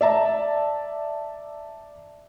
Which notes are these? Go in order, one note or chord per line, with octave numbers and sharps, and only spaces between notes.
D5 E5 A5 A#5